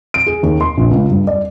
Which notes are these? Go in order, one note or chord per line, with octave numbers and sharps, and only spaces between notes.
D7
G#4
D#2
C6
A#1
C#2
G2
D5